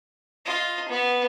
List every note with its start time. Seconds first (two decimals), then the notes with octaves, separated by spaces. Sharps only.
0.45 F4 D#5
0.89 B3